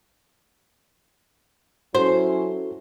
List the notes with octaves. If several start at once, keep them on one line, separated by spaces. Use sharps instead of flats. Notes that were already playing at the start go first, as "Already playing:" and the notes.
F#3 C#4 E4 F#4 A4 C5